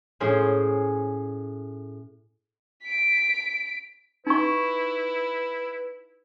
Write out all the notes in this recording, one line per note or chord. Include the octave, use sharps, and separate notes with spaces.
A2 C#4 G#4 C5
B6 D7
D#4 E4 B4 C#6